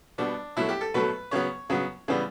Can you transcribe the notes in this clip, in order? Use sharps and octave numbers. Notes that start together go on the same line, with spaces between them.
B2 G3 B3 D4
B2 F#3 A3 E4
G4
A4
B2 F#3 A3 B4
C#3 F#3 B3 C#5
C#3 F#3 B3
C#3 E3 G3 B3